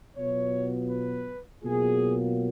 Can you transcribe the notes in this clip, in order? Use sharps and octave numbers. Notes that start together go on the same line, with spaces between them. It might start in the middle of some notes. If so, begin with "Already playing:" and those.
B2 F#3 B3 F4 C#5
B4
B2 F#3 A#3 F4 G#4